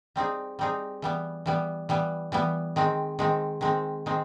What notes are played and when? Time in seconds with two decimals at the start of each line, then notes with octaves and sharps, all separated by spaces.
0.16 G3 C4 D#4 G#4
0.59 G3 C4 D#4 G#4
1.02 E3 G3 B3
1.46 E3 G3 B3
1.89 E3 G3 B3
2.32 E3 G3 B3
2.76 D#3 G#3 C4
3.19 D#3 G#3 C4
3.61 D#3 G#3 C4
4.06 D#3 G#3 C4